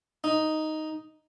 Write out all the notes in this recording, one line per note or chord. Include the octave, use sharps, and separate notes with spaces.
D#4